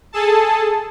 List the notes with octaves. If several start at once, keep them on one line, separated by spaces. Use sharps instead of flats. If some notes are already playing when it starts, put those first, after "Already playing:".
G#4 A4 A5